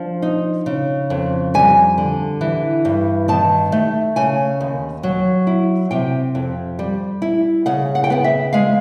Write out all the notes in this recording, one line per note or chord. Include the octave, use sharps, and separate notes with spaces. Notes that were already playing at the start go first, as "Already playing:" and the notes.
Already playing: F3 D4
D#4
C#3
F2
G3 G#5
D3
E3
G2
D#3 A5
A3
C#3 G#5
D#2
F#3
E4
C3 G5
F2
G3
E4
C#3 F#5
F#5
G5
B3 F#5
E5
G#3 F5